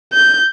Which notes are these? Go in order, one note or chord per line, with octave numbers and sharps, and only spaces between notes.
G6